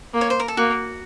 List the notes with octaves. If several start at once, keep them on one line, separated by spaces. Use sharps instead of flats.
A#3
C#5
C5
A#4
A4
A#3 F#4